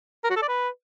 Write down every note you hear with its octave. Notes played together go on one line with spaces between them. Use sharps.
A#4
F#4
A4
D5
B4